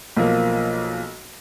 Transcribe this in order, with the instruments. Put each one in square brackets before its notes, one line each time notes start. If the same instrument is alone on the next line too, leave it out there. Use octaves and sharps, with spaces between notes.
[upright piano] B1 F3 A#3